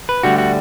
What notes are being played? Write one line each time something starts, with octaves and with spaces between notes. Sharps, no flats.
B4
D2 D3 G3 F#4
F#4